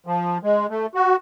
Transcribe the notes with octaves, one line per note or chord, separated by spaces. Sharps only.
F3
G#3
A3
F#4